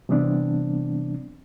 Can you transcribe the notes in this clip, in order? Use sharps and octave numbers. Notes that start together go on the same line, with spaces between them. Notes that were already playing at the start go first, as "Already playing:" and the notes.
C3 E3 G3 B3 C4 D4